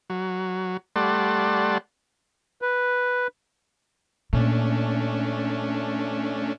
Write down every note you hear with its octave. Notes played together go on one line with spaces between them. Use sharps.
F#3
G3 A3 D5 F#5 A5 C6
B4
A#2 A3 C#4 D4